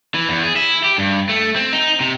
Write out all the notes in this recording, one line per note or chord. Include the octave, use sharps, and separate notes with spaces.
E3
E2
G#4
E4
G4
G2
A3
C4
D#4
C3